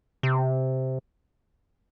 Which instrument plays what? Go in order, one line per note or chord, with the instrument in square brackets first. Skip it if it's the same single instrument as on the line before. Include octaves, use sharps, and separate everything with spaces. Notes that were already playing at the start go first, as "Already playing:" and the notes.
[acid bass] C3